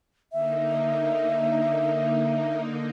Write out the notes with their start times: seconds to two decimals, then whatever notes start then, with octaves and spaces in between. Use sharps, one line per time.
0.32 D3 A#3 D#4 E5